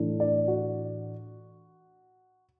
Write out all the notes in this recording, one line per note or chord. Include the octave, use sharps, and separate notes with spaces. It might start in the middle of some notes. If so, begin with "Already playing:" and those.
Already playing: A2 E3 D4
D5
F#4